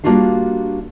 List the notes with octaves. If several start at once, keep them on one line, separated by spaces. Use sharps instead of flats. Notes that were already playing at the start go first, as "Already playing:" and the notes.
G3 A#3 D4 F4 F#4 F5